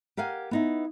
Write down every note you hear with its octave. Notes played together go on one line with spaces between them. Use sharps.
G4 A#4 F5 F#5 G#5
B3 D#4 E4